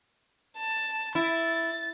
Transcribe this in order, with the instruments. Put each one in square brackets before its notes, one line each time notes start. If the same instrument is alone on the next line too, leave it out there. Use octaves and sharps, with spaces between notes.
[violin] A5
[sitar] E4 [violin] A6